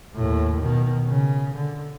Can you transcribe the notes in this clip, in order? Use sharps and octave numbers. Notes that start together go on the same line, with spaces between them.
D#2 A2
B2 D#3
C#3
D3